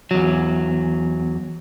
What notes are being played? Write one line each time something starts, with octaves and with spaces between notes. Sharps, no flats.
E2 F#3